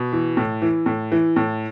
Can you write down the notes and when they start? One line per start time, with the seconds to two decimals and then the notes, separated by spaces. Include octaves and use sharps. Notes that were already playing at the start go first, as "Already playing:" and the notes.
Already playing: B2
0.13 E3
0.37 A2
0.62 E3
0.86 A2
1.12 E3
1.36 A2